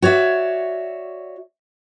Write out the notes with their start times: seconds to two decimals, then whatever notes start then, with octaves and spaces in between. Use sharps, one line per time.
0.02 F#4 C#5 D5 E5